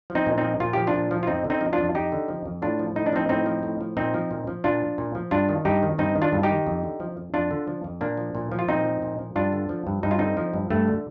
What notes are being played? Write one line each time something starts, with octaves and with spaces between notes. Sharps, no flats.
F3
C4 D#4
A#2
C4 D#4
F3
A#2 F4
F3 G4
D4 F4
A#2
F3
F4
F2 C4 D#4
D3
C4 D#4
F3
D4 F4
F2
F2 D#4 G4
D3
F3
F2
A2 D4 F4
F3
A2 D#4
D4
F3 C4 D#4
A2 C4 D#4
F3
A2
F3
A#2 C4 D#4
F3
A#2
F3
A#2 D4 F4
F3
A#2
F3
G2 D4 F4
D#3
G2 D#4 G4
D#3
G2 C4 D#4
D#3
D4 F4
G2
D#4 G4
D#3
F2
D3
F3
F2
F2 D4 F4
D3
F3
F2
A#2 A#3 D4
F3
A#2
F3
F4
A#2 C4 D#4
F3
A#2
F3
G2 D4 F4
D3
F3
G2
G2 D#4
F4
D3 C4 D#4
F3
G2
G2 A3
D3